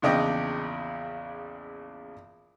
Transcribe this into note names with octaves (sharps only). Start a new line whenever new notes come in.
A#1 E2 C#3 D4 D#5 G5